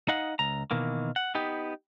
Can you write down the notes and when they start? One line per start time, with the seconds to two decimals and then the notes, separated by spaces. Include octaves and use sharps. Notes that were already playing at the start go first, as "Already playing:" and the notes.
0.08 D#4 D#5 F5 F#5
0.39 C#2 A#5
0.71 B2 D#3 E3 A#3
1.16 F#5
1.35 B3 D#4 G4